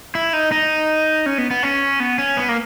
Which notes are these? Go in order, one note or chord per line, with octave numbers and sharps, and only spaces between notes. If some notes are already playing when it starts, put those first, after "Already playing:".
E4
D#4
D#4
C#4
B3
B3
C#4
B3
C#4
B3
A#3